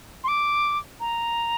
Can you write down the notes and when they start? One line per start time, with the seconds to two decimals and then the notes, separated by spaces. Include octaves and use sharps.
0.24 C6
0.28 D6
1.00 A#5